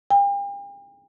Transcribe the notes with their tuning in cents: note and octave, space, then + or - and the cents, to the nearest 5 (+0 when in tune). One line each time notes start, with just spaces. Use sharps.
G5 +40